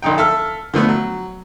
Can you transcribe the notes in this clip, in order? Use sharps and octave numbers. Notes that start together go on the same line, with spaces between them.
A#1 D3 D#4 G5
A4 E5 F6
D3 F3 A3 B3
F#3